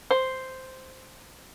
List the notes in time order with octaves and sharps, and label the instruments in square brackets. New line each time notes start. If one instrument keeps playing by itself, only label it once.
[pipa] C5